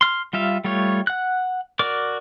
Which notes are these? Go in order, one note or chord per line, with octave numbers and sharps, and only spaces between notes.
C6 F6
G3 F4 E5 F5
G3 A3 F4 C#5
F#5 F#6
F#4 A#4 D5 D6